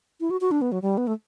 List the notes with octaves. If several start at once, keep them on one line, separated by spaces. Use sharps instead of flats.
E4
F#4
F#4
D4
B3
F#3
G3
B3
A3